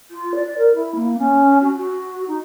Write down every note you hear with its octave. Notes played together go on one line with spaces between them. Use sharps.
F4
D5
A#4
E4
A#3
C#4
F#4
F#4
D#4